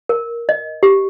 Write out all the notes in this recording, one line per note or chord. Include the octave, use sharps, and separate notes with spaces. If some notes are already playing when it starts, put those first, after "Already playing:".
A#4
D#5
G4